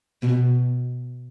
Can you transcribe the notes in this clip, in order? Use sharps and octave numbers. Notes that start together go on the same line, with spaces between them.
B2